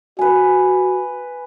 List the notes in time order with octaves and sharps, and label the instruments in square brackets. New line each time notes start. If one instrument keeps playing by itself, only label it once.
[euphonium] F#4 [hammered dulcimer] B4 G#5